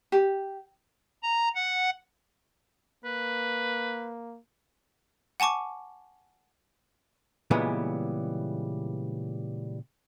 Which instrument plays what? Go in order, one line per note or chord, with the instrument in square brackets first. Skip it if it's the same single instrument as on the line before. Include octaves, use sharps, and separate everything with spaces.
[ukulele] G4
[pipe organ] A#5
F#5
[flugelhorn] A#3 [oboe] B4
[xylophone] F#5 G#5 A5 C#6 D6
[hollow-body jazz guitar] A#2 C#3 E3 G3 G#3 B3